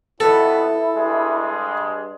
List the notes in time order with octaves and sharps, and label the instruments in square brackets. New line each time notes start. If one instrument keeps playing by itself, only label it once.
[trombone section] F2 B2 B3 [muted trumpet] E4 [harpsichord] A4
[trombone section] G2 G#3